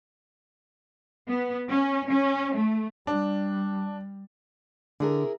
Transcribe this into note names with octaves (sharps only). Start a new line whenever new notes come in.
B3
C#4
C#4
A3
G3 D4
D3 E4 G#4 A#4